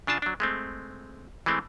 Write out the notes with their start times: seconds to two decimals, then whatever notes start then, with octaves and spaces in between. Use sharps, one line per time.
0.07 C#3 D4 F4 A5
0.22 F#3 D4
0.40 G#3 A3 C4
1.46 E3 G#3 A3 C4